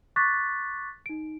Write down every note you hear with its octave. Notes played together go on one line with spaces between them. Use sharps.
C#6 D6 F#6 A6 B6
D#4 D7